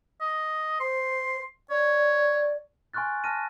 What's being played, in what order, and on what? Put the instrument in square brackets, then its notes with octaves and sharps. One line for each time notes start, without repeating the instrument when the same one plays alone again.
[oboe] D#5
[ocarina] C5 [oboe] C6
[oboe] C#5 [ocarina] D5
[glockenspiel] G#5 C6 C#6 F6 F#6 A6
A5 F6 A#6 D#7